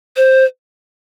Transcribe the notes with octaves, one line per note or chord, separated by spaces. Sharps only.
C5